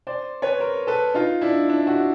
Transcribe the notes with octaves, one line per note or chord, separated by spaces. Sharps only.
C5 D5
B4 C#5
A#4 C5
A4 B4
D#4 F4
D4 E4
D4 E4
E4 F#4